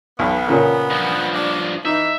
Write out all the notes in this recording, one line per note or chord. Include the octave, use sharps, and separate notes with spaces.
B1 B3
A#2 C#3 A#3
G2 F3
D4
E3 D#4 E5